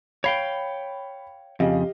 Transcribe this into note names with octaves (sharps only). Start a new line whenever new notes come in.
C#5 F5 G5 B5
F2 C#3 G4 D#5 F5